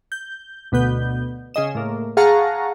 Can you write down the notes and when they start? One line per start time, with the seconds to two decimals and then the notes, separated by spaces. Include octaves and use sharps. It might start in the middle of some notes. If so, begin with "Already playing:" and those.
0.12 G6
0.72 D2 B2 B3 G6
1.54 C#3 G#4 D#5 E7
1.75 A2 A#3
2.17 G#4 F5 F#5 A5 A#5 C#6